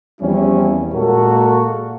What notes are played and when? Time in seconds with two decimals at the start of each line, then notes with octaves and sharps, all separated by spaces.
0.22 E2 F3 G3 C4 C#4 E4
0.94 A#2 G#3 A#3 F#4 A4 A#4